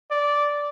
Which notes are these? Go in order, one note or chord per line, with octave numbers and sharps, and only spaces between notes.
D5